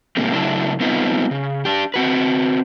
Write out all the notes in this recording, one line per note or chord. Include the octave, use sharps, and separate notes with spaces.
A#2 D3 G3 A3 A#3 C4
C#3 F#3 A3 D4 E4
G3 B3 C4 D#4 F4 B4
C#3
D4 G4
C4 F#4 B4